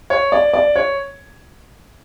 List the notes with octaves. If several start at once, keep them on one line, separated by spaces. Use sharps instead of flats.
C#5
D5
D5
C#5